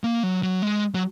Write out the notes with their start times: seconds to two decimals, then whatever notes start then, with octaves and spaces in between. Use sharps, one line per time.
0.04 A#3
0.23 F#3
0.43 F#3
0.62 G#3
0.95 F#3